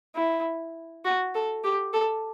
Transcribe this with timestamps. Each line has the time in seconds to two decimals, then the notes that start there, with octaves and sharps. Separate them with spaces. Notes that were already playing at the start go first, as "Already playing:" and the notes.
0.15 E4
1.05 F#4
1.35 A4
1.64 G4
1.93 A4